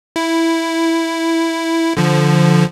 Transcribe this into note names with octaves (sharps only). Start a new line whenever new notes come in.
E4
D3 F3